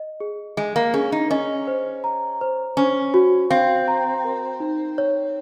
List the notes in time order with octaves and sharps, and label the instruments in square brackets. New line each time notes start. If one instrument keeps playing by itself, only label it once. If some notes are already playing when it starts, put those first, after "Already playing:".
Already playing: [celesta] D#5
G#4
[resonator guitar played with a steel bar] G#3 [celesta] G#5
[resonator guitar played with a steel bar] A#3
[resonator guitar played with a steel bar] C#4 [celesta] G#4
[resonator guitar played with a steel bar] D#4
[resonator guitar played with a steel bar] C#4 [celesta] D#5
[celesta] C5
A#5
C5
[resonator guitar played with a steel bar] C#4 [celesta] C5
[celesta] F#4
[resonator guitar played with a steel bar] C4 [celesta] F5
[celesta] A#5
A#4
D#4
C#5